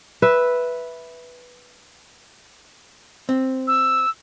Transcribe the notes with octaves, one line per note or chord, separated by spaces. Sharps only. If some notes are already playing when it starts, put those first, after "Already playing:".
B4 E5
C4
E6